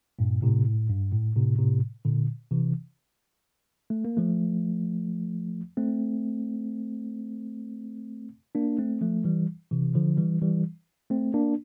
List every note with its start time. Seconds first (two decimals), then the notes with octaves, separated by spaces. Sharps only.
0.19 G2 A#2
0.42 A2 C3
0.65 A2
0.89 G2
1.13 A2
1.36 A2 C3
1.58 A2 C3
2.05 A#2 D3
2.51 C3 E3
3.90 A3
4.05 A#3
4.17 F3 A3
5.77 A3 C4
8.55 A#3 D4
8.79 A3 C4
9.01 F3 A3
9.24 E3 G3
9.71 C3 E3
9.95 D3 F3
10.17 E3 G3
10.41 E3 G3
11.10 A3 C4
11.34 A#3 D4